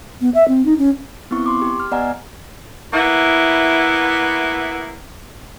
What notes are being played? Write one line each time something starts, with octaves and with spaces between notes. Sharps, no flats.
B3
E5
C4
D#4
C#4
B3 C4 E4 C#6
C6 D6
G4
F6
B3 D5 D#5 F#5 G#5 A#5
A#3 B3 E4